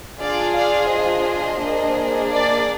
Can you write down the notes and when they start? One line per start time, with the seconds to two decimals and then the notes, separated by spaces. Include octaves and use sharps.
0.21 D4 F4 G#4 D5 F5
0.56 D5 F5
0.92 C5 D#5
1.63 A#3 D4 G#4
2.33 D5